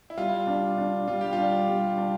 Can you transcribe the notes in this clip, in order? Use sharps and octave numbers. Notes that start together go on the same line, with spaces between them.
E4
G3 F4
D4
D4
G3 F4
G4
D4 F4
G3
D4